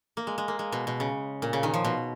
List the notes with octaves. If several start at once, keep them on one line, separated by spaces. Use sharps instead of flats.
A#3
G#3
G#3
A#3
G#3
B2
B2
C#3
A#2
C#3
D#3
F3
B2